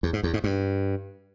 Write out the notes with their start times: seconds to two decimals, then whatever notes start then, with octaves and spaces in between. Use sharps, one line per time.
0.03 E2
0.13 G#2
0.23 E2
0.34 G#2
0.44 G2